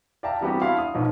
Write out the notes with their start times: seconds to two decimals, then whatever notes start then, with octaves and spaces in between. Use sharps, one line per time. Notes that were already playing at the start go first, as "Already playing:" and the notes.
0.23 D5 E5 F5 G5 A5 A#5
0.41 E3 G3 B3 C4 F#4 G4
0.61 D4 E4 F5 F#5 A5 C6
0.78 D#6
0.94 E1 B1 G#2 F3 D#5